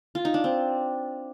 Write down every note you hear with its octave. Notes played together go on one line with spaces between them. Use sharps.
F4
D#4
D4
C4